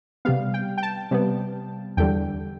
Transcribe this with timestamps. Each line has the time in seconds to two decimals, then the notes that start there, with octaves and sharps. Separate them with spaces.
0.25 C3 G3 B3 F5
0.54 G5
0.78 G5
0.83 A5
1.11 C3 G3 B3
1.97 E2 D3 G3 G5